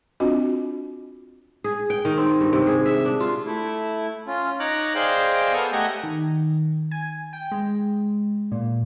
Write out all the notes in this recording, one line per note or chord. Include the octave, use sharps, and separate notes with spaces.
C4 D4 F4 F#4 D#5
G#4
G5
D#3
C4
G2
C3
G#4
E5
D4
F4
A3 E4
C#4 F4
D#4 C#5 A#5 D6 F#6
G#4 C5 D5 D#5 F5 G5
B3 A4 C#6 D#6 F6
A3 G4 D#5 F#5 G#5 A#5
D#3
G#5
G5
G#3
A#2